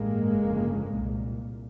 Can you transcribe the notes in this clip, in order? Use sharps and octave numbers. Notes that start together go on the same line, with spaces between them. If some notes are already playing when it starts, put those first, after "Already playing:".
Already playing: A1 G2 G#3 A#3
G1 F2 C#3
C2 A#2